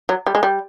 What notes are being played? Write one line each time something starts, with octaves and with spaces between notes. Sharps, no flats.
F#3
G3
G#3
G3